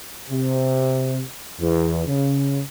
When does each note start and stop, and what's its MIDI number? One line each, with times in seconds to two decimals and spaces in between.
0.30 1.21 48
1.60 2.03 40
2.07 2.62 49